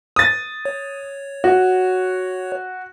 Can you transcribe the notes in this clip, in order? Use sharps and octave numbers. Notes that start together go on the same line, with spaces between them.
D#6 A6
C#5
F#4